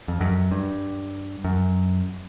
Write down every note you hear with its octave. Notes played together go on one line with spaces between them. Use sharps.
F2
F#2
G2
F#2